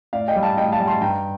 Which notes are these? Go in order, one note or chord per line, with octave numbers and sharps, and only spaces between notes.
A2 D5 F5
D#5 G5
G3
F5 A5
A2 D#5 G5
F5 A5
G3
A5 C6
G2 G5 A#5